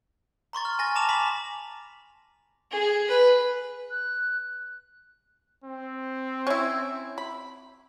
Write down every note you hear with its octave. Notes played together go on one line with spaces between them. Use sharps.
A#5 C6 C#6 A6
F6
G#5 A6 A#6
A5 A#5 D6 E7 F7
B5 D6 A#6 B6
G#4
B4
F#6
C4
C#4 E4
B5